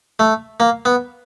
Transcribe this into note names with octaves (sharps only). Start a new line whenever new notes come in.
A3
A#3
B3